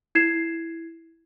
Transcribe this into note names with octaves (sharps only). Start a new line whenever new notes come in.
E4 G#6 C7 E7